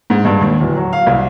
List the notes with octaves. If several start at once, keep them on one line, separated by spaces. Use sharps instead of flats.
G#2
G2
D#2
D1
F#3
F5
C2